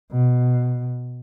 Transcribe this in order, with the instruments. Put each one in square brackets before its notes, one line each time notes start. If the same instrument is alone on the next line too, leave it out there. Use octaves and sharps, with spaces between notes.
[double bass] B2